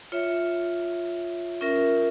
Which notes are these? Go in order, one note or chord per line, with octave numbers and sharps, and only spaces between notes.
F4 C#5 E5
C#4 F4 A#4 E5